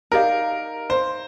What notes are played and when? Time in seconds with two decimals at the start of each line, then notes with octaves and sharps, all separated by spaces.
0.11 D#4 G4 A#4 D5 F5
0.90 C5